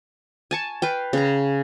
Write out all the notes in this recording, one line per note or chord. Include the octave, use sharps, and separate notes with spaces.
G#5 A5 C#6
B4 F5 G5
C#3 A#5